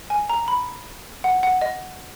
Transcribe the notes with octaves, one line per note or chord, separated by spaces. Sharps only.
G#5
A#5
B5
F#5
F#5
D#5